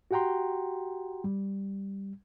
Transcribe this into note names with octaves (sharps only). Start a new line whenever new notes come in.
F#4 G4 F#5 G5 A#5 C6
G3